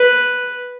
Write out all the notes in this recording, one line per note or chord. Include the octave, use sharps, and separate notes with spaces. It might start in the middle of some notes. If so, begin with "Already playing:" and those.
Already playing: B4